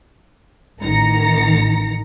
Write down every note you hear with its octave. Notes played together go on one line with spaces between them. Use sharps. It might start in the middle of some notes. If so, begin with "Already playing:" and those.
A1 D#3 E3 A#5 A#6 C#7